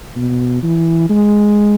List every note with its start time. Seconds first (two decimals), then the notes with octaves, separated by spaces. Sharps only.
0.16 B2
0.63 E3
1.10 G#3